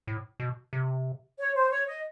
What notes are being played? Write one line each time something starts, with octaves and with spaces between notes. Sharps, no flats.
A2
B2
C3
C#5
C5
C#5
D#5